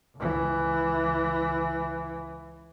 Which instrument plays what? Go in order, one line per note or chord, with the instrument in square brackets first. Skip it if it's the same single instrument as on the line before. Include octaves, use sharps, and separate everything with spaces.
[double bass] C#2 E3